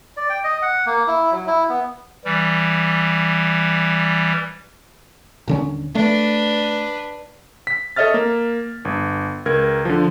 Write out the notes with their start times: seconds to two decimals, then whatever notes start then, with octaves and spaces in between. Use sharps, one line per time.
0.17 D5
0.30 G5
0.44 D#5
0.62 F#5
0.86 A#3
1.07 E4
1.32 F#3
1.47 E4
1.69 B3
2.25 E3 G3
5.48 D#1 D3 C#4
5.95 A3 D4 B4
7.67 B6
7.96 A4 C#5 D#5 E5 F6 A6
8.14 A#3
8.85 G1
9.46 C#2 A#4 G#6
9.85 D3 F3